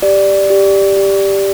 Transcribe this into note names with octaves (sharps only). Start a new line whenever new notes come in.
G4 D5
G4
G4